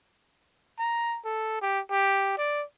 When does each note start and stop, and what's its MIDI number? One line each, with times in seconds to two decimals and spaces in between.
0.79 1.19 82
1.25 1.58 69
1.61 1.80 67
1.91 2.34 67
2.38 2.63 74